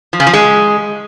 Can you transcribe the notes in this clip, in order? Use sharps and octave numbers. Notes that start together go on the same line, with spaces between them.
F3
C#3
F3
G#3